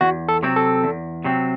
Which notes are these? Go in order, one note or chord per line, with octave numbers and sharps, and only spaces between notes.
E2 F#4
A4
C3 F#3 C4
A4
E2
C3 F#3 C4